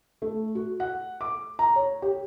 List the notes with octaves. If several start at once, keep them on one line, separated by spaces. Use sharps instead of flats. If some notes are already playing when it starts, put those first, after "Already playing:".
A3
F#4
F#5
D6
A#5
C#5
G4